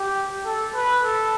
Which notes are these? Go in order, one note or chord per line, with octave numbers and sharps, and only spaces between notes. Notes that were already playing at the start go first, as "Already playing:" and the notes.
Already playing: G4
A4
B4
A4